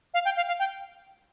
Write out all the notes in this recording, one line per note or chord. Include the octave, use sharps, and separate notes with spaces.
F5
G5
F5
F5
G5